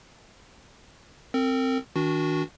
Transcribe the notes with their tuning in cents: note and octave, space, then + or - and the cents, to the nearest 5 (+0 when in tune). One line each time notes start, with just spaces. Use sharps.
C4 +0 A#4 -40
D#3 +30 D4 -25 F#4 -15